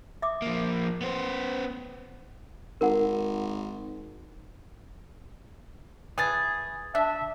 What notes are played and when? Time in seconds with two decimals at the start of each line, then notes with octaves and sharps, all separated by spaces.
0.22 E5 D6 D#6
0.42 F3 A#3
1.01 B3 C5
2.81 G#1 A#4 F#5
6.18 E3 G#4 D#6 A6
6.95 D4 E5